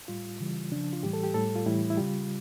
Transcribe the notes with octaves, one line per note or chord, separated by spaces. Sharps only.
A2 G3 F4
C#3 E3 G3
C#3 F3 D4
F4
A2 E3 G3 G4
A4
G4
A2 G3 A4
F4
A2 E3 G3 E4
E4
C#3 G3 F4